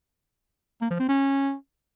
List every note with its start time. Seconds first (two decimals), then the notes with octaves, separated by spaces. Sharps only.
0.82 A#3
0.91 F3
1.00 C4
1.09 C#4